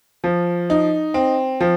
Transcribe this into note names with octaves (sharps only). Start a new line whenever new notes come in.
F3
D#4
C4
F3